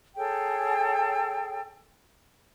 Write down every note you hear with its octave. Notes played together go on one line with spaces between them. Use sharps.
G#4 A4 C#5 G5